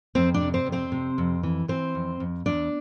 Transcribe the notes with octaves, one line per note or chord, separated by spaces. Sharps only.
F2 C4 C5
D4 D5
C3
C4 C5
F2
C4 C5
C3
F2
E3
E3 C4 C5
F2
F2
E2 D4 D5